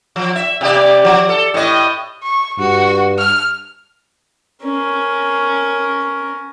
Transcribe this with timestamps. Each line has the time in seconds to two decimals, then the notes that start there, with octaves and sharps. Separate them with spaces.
0.16 F3
0.36 E5
0.61 C3 G4 D5
1.04 F3
1.29 A4
1.54 A2 D#5
2.23 C#6
2.59 G2 F#4
3.18 F6
4.63 C#4 A#4